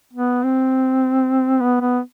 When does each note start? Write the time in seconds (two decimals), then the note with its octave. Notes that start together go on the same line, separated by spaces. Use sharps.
0.14 B3
0.43 C4
1.60 B3
1.81 B3